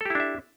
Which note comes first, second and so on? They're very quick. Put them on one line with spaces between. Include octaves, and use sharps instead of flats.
A4 G4 E4 D4 E5